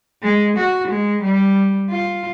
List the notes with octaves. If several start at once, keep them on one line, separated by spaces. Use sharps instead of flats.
G#3
F#4
G#3
G3
F4